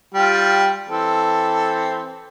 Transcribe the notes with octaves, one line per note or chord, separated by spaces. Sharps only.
G3 F4 G4
E3 C4 A4